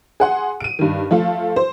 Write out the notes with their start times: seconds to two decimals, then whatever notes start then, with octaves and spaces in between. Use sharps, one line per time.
0.20 G#4 F#5 C6
0.60 D7 D#7
0.79 G2 D#3
1.11 F3 A3 F4
1.56 C5